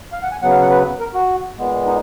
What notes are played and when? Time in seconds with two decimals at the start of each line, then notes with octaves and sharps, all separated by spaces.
0.13 F5
0.23 F#5
0.32 G#5
0.42 C#3 F#3 B3 F#5
0.51 F5
0.62 F#5
0.70 B4
1.00 A#4
1.14 F#4
1.57 A#2 G#3 B3
1.86 D#4